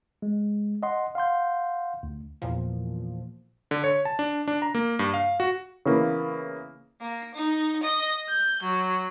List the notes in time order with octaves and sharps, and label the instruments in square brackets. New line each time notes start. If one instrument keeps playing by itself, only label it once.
[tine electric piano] G#3
D#5 F#5 C6
F5 F#5 C6 G6
D2
[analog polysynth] E2 A#2 F3
[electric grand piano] D3
C#5
A5
D4
D4
A#5
A#3
G2
F5
F#4
[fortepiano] C#3 E3 A#3 B3
[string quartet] A#3
D#4
D#5
G6
F#3